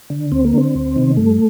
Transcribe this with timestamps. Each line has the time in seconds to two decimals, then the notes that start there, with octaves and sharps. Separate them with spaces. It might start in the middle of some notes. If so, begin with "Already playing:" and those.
0.10 D3
0.32 D2 C4
0.45 A#3
0.53 D3 C4
0.75 D2
0.96 C3 D#3
1.17 G2 A3